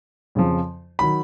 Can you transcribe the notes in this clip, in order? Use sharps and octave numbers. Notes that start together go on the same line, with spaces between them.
F2 C#3 F3
D#3 F#3 B5